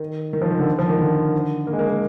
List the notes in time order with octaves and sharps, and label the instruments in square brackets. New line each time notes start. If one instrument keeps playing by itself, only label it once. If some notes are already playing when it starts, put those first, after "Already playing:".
Already playing: [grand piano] D#3
D#3
F3
D#3
D3
F3
D#3
D3
A#3
G#3
A#3
A#3